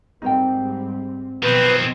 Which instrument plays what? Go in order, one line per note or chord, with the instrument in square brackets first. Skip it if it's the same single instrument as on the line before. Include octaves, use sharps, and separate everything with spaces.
[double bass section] G#2 G3 C4 [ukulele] D#4 A#4 G5
[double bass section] B2 F3 F#3 [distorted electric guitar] D#3 C4 [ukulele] A#4 [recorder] B4